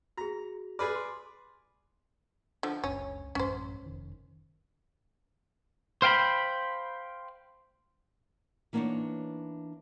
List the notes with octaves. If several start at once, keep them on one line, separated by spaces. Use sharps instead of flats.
F#4 G#4 A#5
G#4 B4 D5 F6
C6 D6
D3 F3
F#1 C#2 C#4
A1 F#2 G3 C#4 C5
F1 D#3
C5 F5 G5 A5 B5
E3 A#3 B3 D4 D#4 C#5